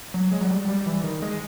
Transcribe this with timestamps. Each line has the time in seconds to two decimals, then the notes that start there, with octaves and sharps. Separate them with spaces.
0.14 F#3
0.31 G#3
0.41 F#3
0.50 G3
0.68 G3
0.86 E3
1.03 D#3
1.22 G#3